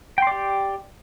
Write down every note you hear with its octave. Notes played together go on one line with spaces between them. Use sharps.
G4 D5 G5 C6